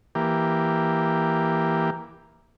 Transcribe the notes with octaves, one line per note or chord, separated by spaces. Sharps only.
E3 A#3 G4